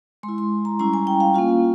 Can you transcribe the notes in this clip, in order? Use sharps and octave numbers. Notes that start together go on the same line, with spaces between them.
G#3 C6
E4
C6
A#5
G3 C#4 E4 A#5
G#5
G5
F5
A#3 C#4 F4 F5